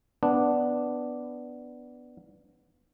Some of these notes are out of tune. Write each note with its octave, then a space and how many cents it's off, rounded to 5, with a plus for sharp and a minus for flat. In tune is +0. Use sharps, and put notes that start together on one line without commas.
B3 +5 D4 +0